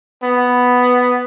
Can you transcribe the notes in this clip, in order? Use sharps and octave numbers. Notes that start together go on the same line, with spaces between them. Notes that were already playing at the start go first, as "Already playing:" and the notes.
B3